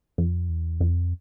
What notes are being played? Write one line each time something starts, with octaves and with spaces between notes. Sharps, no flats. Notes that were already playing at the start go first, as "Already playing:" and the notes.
F2
E2
F2